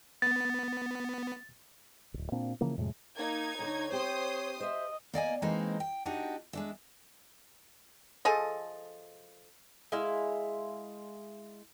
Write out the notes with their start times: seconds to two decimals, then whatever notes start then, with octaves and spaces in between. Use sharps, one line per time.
0.22 B3 A6
2.14 D1 G1
2.32 A#2 A#3 C4 D4
2.61 C#3 E3 F3 A#3
2.77 F2 A2 C3 G#3
3.17 A#3 D#4 G#6
3.59 D2 D3 C#5
3.92 C4 G4 C5 C6 D#6
4.60 C5 D#5 E5
5.14 A#3 D5 D#5 G#5
5.42 E3 G#3 A#3 C4 D#4 C5
5.80 G5
6.06 D4 D#4 F#4 G4 D#5
6.53 G#3 D4 E5
8.25 F3 G#4 A4 D#5
9.92 G#3 E4 F5